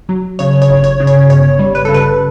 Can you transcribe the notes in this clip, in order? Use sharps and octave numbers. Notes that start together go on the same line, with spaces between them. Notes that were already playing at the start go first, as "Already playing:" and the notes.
F#3
C#3 C#5
C#5
G1
C#5
C#3
C#5
G1 C#5
G3
B4
C#3 A4
B4